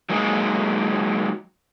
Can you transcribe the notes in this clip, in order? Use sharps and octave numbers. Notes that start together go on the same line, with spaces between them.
F#3 G#3 A#3 D#4